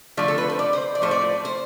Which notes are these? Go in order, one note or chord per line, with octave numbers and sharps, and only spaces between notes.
D3 F3 A3 D5
A4
B4
C5
D5
C5
D5
A2 F3 A3 C5
D5
C5